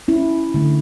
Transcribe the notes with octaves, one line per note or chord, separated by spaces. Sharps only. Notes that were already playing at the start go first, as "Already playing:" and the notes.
C#4 E4
D3 A3